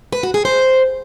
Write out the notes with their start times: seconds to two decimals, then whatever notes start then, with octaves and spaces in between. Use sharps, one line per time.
0.12 B4
0.23 F#4
0.34 G#4
0.45 C5